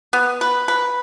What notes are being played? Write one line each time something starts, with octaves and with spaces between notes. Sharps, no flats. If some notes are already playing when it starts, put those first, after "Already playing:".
B3
B4
B4